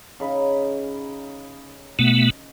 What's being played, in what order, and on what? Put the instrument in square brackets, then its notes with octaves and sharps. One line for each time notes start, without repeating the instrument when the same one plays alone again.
[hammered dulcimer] C#3 D#4 B5
[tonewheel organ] B2 A3 B3